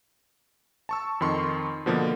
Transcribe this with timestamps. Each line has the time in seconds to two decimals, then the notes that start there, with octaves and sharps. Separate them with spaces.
0.89 A5 C#6 E6
1.21 F2 D#3 C6 C#6
1.86 B2 D3 F3 A#3 B3